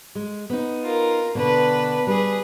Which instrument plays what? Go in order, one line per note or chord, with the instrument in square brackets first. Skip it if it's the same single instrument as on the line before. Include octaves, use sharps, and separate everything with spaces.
[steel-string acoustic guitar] G#3
B3 D#4
[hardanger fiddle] F4 A#4
[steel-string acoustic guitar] B2 D3 B3 [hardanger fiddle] D4 B4
[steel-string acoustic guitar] G3 [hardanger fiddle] G#4 B4